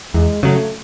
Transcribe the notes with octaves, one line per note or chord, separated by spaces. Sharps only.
E2 G#3
C#3 F#3 A3